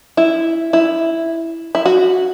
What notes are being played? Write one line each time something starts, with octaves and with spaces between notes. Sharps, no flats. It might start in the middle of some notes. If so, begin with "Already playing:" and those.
E4
E4
E4
F#4